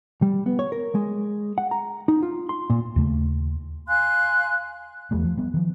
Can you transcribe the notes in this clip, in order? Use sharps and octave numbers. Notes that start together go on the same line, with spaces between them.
G3
B3
C#5
A#4
G#3
F#5
A#5
D#4
F4
C6
A#2
D#2 C#3 A3
F5 G#5 C6 F#6
E2 F3 G3 A3
F3
G3 B3
D#3 F3